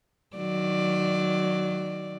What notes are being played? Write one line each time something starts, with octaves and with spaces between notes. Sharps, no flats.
D#3 F#3 D5